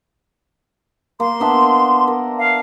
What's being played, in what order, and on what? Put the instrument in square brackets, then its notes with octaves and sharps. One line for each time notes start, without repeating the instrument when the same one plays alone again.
[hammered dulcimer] A#3 [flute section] C6
[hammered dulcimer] B3 D4 E5
A#4
[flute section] F5